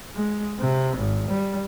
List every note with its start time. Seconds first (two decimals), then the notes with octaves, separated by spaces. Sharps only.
0.15 G#3
0.59 C3
0.97 G#1
1.28 G3